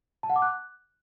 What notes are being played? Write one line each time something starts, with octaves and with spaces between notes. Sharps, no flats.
A5
F#5
D6
F#6